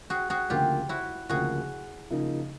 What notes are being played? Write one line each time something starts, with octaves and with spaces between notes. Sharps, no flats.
F#4 G#4
F#4 G#4
D2 C#3 F3 A#3 F4 G4
E4 F#4
D2 C#3 F3 A#3 F#4 G#4
C#3 F3 A#3 D#4